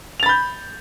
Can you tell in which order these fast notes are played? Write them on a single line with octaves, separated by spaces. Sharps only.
F7 A6 B5 G6